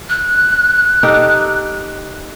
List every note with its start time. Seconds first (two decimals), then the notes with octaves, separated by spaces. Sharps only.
0.09 F#6
1.03 D#4 G4 A4